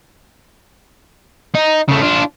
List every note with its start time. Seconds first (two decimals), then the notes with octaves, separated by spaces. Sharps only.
1.55 D#4
1.89 C#3 A3
2.02 D4 F4